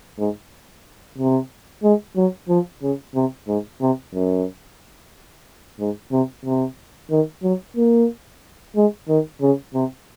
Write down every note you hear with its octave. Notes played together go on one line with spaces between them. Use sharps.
G#2
C3
G#3
F#3
F3
C#3
C3
G#2
C3
F#2
G#2
C3
C3
D#3
F#3
A#3
G#3
D#3
C#3
C3